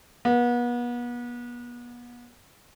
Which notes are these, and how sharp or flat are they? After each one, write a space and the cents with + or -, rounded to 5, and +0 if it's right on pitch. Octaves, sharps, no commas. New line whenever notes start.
B3 -35